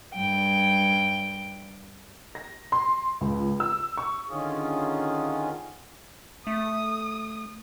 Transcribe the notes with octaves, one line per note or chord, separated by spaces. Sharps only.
G2 G5
A#6
C6
C#2
E6
C#6
D3 D#3 C#4 F4 G#4
A3 D#6